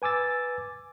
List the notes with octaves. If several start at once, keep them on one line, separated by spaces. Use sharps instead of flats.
B4 G#5 D6 E6 A6